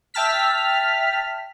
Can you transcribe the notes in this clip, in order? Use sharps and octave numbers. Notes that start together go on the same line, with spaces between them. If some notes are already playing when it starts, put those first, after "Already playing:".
E5 G5 A5 F6 B6